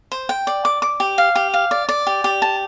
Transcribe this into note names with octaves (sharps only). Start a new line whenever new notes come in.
C5
G5
D5
D6
D6
G4
F5
G4
F5
D5
D5
G4
G4
A5